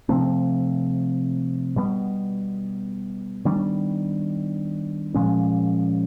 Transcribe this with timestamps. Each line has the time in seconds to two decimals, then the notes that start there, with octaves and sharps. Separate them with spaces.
0.09 C3 F3 A3 C4
1.76 B2 G3 B3
3.45 D#3 G3 B3 D4
5.14 A#2 F3 G#3 C#4